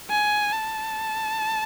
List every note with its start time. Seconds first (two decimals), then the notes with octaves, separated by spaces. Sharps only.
0.10 G#5
0.53 A5